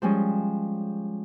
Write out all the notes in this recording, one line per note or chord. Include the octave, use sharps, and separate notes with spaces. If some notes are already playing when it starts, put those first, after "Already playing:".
F3 G3 G#3 C#4